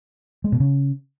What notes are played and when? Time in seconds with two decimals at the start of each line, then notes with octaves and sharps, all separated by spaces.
0.44 G#3
0.52 B2
0.60 C#3